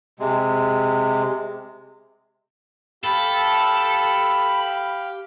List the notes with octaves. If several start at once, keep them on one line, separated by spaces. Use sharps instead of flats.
C3 G#3
G4 A4 F5 G5 B5